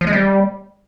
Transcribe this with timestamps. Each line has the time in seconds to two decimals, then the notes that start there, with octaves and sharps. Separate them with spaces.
0.01 F3
0.07 G#3
0.13 G3